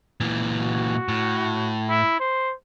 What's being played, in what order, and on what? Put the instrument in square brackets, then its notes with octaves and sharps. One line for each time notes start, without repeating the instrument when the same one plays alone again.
[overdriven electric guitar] A#2 E3
[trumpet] F#4
[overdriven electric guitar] A2
[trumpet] E4
C5